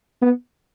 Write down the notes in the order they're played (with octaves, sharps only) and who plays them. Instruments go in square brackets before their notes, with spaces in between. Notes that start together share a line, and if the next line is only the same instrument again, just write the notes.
[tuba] B3